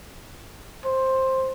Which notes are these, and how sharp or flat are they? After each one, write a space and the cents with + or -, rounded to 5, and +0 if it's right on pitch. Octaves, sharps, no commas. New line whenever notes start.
C5 +10